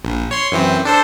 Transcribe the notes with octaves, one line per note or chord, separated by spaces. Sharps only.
A#1
C#5 C6
F#2 E3 C4
D4 A4 C5